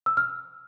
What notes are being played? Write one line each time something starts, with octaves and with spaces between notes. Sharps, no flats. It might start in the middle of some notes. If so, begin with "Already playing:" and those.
E6
F6